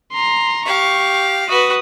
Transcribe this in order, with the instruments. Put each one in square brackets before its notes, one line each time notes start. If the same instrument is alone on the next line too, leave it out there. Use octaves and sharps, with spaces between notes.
[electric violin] A#5 C6
[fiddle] G4 F5 [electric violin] C#6
[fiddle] F#4 B4 [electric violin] D#6